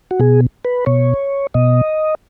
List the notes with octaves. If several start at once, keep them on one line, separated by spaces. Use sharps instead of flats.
F#4
B2 G#4
B4
B2 C#5
B2 D#5